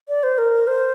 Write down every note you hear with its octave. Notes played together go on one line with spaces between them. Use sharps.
D5
C5
A#4
C5